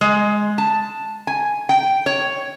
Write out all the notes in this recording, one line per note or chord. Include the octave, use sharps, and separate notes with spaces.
G#3
A5
G#5
G5
C#5